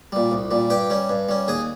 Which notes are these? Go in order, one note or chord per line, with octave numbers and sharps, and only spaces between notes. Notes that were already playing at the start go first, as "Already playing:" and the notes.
A#2 G3
C2
A#2 G3
G2 G4 G5
G3 C#4
G2
G3 C#4
D#2 G#4 G#5